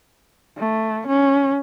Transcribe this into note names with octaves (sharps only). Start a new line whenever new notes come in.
A3
C#4